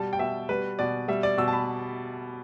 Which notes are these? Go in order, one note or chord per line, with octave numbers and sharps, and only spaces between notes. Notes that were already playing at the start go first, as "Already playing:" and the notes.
Already playing: B2 G3 A5
G5
B2 E5
G3 B4
B2 D5
G3 E5
D5
B2 E6
A5
B5